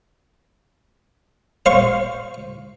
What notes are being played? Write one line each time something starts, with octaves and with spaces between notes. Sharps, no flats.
C5 F5 C#6